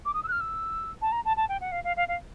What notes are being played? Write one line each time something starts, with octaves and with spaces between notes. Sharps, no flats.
D6
D#6
E6
F#6
F6
E6
A5
A#5
A5
A5
G5
F#5
F5
F5
F5
F5